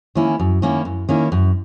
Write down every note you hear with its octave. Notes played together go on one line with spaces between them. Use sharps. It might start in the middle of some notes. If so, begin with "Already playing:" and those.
D#3 A#3 C#4 E4
F#2
D#3 A#3 C#4 E4
F#2
D#3 A#3 C#4 E4
F#2